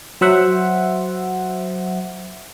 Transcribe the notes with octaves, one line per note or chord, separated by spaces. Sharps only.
F#3 C5 E5 F#5